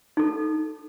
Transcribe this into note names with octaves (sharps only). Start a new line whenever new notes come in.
D#4 A4